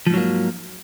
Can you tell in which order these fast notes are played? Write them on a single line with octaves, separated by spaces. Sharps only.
F3 G#2 F#3 A#3